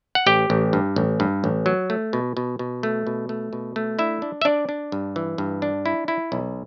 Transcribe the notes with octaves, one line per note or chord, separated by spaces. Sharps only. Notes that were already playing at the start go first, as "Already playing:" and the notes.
F#5
A1 G4 G5
A1
G2
A1
G2
A1
F#3
A3
B2
B2
B2
A3
B2
A3
B2
A3
D4 E4 E5
D4
E5
D4 D5
D4
G2
E3
G2
D4
E4
E4
B1